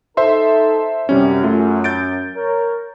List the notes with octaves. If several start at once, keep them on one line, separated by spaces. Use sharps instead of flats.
D#4 A4 C5 E5 C6
F#2 C3 G3 C#4
A3 F4
G6 A6 D7
A#4 C#5